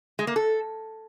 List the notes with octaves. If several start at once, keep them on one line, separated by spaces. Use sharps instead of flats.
G#3
A#3
A4